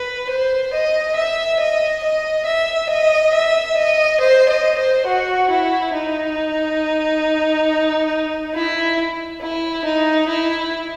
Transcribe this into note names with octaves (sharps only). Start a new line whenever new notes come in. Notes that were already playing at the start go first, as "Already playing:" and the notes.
Already playing: B4
C5
D#5
E5
D#5
D#5
E5
D#5
E5
D#5
C5
D#5
C5
F#4
E4
D#4
E4
E4
D#4
E4